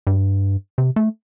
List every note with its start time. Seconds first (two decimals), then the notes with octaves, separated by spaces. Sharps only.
0.07 G2
0.78 C3
0.96 A3